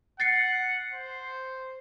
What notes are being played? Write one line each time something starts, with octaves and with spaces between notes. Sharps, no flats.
F#5 A6 C7 C#7
C5